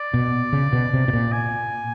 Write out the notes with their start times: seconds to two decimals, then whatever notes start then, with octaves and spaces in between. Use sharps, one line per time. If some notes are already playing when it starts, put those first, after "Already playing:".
Already playing: D5
0.14 B2
0.53 C#3
0.73 B2
0.93 C3
1.08 B2
1.13 A#2
1.32 G#5